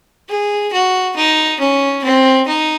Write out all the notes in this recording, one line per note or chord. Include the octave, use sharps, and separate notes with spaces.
G#4
F#4
D#4
C#4
C4
D#4